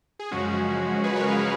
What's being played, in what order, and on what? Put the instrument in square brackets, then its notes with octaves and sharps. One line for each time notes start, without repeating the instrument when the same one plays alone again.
[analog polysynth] G#4
F#2 C#3 F3 G#3 C#4 F#4
G#4 B4
A#4 C#5
C#5 F5